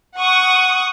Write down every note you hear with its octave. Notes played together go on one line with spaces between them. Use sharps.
F#5 C#6 D#6